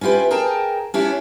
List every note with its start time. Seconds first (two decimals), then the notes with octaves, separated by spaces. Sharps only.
0.01 C#4 E4 F4 G4 B4
0.31 G#4 A#4 G5 A5
0.94 C#4 D4 E4 F4 G4 C#5